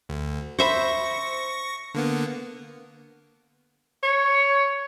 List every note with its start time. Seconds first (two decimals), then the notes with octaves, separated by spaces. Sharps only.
0.09 D2
0.59 C5 E5 B5 C#6 A#6
1.94 D3 A#3 B3
4.03 C#5